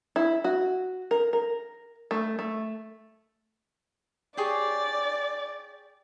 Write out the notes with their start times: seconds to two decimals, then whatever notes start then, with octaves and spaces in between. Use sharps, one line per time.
0.16 E4
0.44 F#4
1.11 A#4
1.33 A#4
2.11 A3
2.39 A3
4.37 G4 G#4 C#5 D5